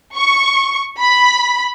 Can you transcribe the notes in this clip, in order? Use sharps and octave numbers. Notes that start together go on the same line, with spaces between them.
C#6
B5